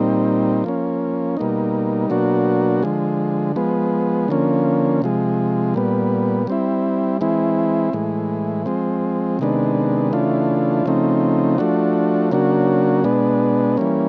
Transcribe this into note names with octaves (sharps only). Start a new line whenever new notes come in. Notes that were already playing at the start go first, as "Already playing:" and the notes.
Already playing: A#2 G3 C4 D#4
F3 A#3 C#4
B2 G3 A#3 D#4
B2 F#3 A#3 D4 F#4
D3 F3 G#3
F3 G#3 B3
D3 F3 A#3 C#4
C3 F3 G#3
A#2 G3 B3
G3 C4 E4
E3 G#3 C4 E4
A2 E3 G#3
F3 G#3 C4
C3 D#3 G#3 B3 D4
C#3 E3 A3 D4 F4
C#3 F3 A3 C4 D#4
F3 A3 D4 F#4
C#3 F#3 A#3 D4 F#4
B2 G#3 B3 D4
E3 G3 A#3 C#4